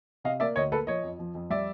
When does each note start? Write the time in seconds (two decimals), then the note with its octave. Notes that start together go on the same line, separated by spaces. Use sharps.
0.24 C3 D#5 F5
0.40 A#3 D5 E5
0.56 D2 C#5 D#5
0.72 A#3 A4 B4
0.87 F3 C#5 D#5
1.03 F2
1.19 F3
1.35 F2
1.50 G3 D5 E5